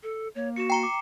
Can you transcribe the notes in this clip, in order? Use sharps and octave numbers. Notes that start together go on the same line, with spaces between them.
A4
A#3 C#5
F#4 C#7 E7
G5 A#5 C7 C#7 G7
D6